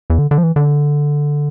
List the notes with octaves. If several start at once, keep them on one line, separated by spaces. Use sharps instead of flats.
E2
D3
D3
F3
E3
D3